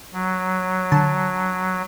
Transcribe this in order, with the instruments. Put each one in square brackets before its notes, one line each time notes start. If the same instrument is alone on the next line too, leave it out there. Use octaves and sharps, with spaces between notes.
[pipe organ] F#3
[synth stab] D3 A5